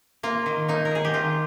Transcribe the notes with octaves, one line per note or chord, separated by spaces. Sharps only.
A#3 F4
D#3
A#3 D#4
A#4
D#3 G#4
G4
D#3 F4